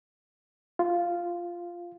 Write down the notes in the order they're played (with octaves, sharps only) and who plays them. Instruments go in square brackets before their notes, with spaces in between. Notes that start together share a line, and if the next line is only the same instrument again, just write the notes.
[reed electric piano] F4